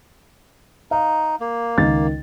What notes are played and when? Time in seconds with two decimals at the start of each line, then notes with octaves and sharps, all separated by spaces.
0.91 D#4 F5
1.40 A#3
1.78 C#2 D#3 A6